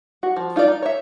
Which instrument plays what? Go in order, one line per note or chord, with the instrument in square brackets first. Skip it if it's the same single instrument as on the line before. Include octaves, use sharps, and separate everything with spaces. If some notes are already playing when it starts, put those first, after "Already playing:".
[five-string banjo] F#4
F3
D#4 F4 G4 D5
D#4
C#5 E5